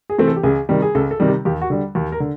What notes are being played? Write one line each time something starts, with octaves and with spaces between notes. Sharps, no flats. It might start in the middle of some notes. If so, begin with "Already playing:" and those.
G#4
C3 E3 A3 C4
A4
G4
C#2 G#4
C3 D#3 G3
G#4
C#2 A4
A4
C3 D#3 G3
G4
D#2 G4
F#4
D3 G3
D#2
A#4
D3